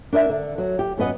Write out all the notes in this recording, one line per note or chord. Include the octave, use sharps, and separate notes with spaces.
D4 A#4 D#5 E5
D3
F#3
G4
F#2 B3 B4 D#5 F#5